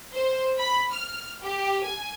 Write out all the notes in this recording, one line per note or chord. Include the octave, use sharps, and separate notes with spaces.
C5
B5
F6
G4
G#5